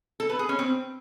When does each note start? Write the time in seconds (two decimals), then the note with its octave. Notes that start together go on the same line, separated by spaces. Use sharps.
0.20 A4
0.29 B4
0.39 G#4
0.49 C#4
0.59 C4